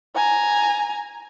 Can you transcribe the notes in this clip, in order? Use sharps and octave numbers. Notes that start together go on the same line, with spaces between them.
G#5 A#5